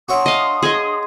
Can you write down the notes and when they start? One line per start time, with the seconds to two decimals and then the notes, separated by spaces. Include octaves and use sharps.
0.09 D4 F#4 C#5 E5 C6 D#6
0.26 D#5 F5
0.63 G#4 D#5